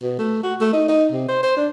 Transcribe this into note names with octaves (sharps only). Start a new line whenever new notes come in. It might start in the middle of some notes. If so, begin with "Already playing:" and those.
B2
A3
F#4
A3
D#4
D#4
C3
C5
C5
D4